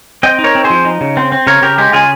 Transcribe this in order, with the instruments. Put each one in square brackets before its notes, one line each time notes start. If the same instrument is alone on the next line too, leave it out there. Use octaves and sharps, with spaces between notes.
[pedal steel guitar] C4 D#5 G5
D#4
A#4 C#5
C4
G#4 C5
F3
D#4
C#3
C4
C4
C#3 A#4 C#5
C#3 G4 A#4
G#3 G4
C#3 F4 G#4